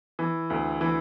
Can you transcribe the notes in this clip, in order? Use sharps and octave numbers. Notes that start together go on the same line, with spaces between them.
E3
D2
E3